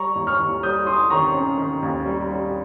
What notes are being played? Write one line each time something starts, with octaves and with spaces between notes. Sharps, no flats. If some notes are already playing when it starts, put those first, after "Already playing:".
Already playing: G3 A#5 C#6
D#2
C#6 F6
D#2
G3 D#6 G6
G3 C6 D#6
D#3 A#5 C#6
C#4
D#3
D#2
G3
G3